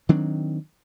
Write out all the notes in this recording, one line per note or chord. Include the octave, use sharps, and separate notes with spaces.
D#3 F#3 C4 D4